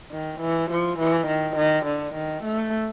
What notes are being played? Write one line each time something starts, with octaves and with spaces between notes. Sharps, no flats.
D#3
E3
F3
E3
D#3
D#3
D3
D#3
A3